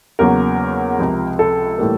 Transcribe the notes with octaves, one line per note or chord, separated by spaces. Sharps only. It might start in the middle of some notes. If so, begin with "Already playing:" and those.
E2 C#3 F#3 A#3 A#4
C#2 C3 F3
A4
A2 E3 G3 A#3